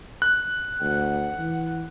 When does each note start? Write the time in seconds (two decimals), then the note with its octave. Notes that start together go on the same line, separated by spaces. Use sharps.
0.22 F#6
0.81 D2 F#5
1.38 E3